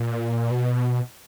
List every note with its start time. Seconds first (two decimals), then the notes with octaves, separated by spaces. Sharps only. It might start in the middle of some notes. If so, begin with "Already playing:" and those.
Already playing: A#2
0.51 B2